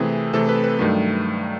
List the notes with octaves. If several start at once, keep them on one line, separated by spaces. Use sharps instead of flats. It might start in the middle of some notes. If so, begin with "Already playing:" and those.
Already playing: C3 E3 A3 C4 G#4
C3 E3 A3 C4 A4
B4
B4
G2 D#3 F#3 A3